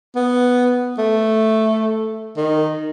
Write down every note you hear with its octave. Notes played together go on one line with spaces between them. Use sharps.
B3
A3
D#3